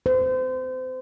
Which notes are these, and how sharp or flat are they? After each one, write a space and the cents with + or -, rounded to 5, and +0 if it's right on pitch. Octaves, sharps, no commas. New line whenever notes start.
C5 -30